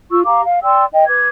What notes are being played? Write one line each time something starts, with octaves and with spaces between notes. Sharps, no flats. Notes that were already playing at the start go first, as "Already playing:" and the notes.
F4 C#6 E6
G4 F5 A#5 D6
F5
D5 G5 C6 E6
D#5 G5
B4 D6 G#6